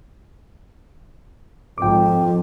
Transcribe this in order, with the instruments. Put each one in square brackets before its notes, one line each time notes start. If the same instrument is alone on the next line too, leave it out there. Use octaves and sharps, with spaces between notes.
[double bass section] G#1 [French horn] F2 [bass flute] F3 [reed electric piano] G5 D6